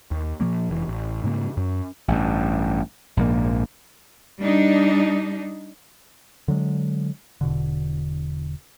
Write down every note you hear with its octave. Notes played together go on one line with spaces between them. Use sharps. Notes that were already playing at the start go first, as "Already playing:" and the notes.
D#2
A#2 F3 A#3
F1 E3
A1
G#2 C#3 A#3
F#2
A1 G2
A#1 G#2 D#3 A#3
G3 D4 D#4
D3 F#3 G#3
E1 B2 D3